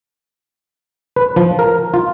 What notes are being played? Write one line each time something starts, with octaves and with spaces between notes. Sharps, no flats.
B4
F3
A#4
F4